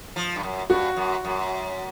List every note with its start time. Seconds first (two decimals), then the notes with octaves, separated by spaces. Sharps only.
0.16 F3
0.36 G2
0.43 F#2
0.70 G2 F#4
0.97 F#2
1.25 F#2